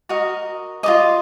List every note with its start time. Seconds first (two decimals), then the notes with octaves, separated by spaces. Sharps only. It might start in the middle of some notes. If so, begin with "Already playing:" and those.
0.09 F#4 A#4 D#5
0.83 F4 A#4 D#5 D6